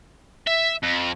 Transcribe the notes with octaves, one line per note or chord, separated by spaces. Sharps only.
E5
F2